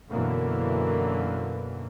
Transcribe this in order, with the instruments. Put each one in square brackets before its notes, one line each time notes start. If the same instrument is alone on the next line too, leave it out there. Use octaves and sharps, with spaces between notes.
[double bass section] F#2 B2 D3 E3 A#3